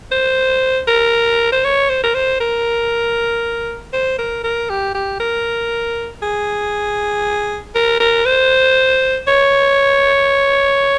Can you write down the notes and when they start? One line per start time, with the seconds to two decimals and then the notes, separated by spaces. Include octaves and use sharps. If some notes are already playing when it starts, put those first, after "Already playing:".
0.11 C5
0.88 A#4
1.52 C5
1.64 C#5
1.89 C5
2.03 A#4
2.14 C5
2.40 A#4
3.93 C5
4.18 A#4
4.44 A#4
4.70 G4
4.94 G4
5.20 A#4
6.22 G#4
7.75 A#4
8.00 A#4
8.25 C5
9.27 C#5